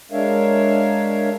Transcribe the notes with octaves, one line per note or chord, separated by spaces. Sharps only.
G#3 D4 A#4 C#5 E5 F5